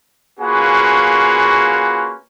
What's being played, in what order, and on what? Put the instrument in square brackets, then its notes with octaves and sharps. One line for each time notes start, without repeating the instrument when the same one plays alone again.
[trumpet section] A#3 C#4 F4 F#4 G#4 B4